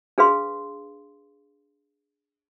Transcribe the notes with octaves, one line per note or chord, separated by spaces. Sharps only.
D4 G#4 B4 F5 C6